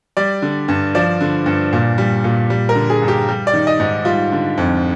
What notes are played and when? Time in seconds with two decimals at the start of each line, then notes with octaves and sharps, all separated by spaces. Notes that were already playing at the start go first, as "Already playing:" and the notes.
0.17 G3 D5
0.42 D3
0.68 G2
0.95 F3 D5
1.21 D3
1.46 G2
1.73 A#2
1.98 G3
2.24 A#2
2.50 G3
2.69 A#4
2.75 D3
2.90 G#4
3.02 G2
3.08 G4
3.28 G3
3.47 D5
3.53 D#3
3.67 D#5
3.80 G#2
4.05 G3 F4
4.32 D3
4.57 F2